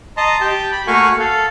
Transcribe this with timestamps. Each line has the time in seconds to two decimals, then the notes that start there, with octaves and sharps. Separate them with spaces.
0.17 D#5 A5 A#5 C6
0.41 G4 G5 A5
0.72 B5
0.87 A3 A#3 F#4 F5 G#5 C#6
1.19 A4 F5